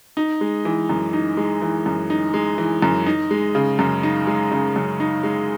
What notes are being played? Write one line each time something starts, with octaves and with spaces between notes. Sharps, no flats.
D#4
G#3
E3
F#2
D#4
G#3
E3
F#2
D#4
G#3
E3
F#2
D#4
G#3
C#3
F#2
D#4
G#3
C#3
F#2
D#4
G#3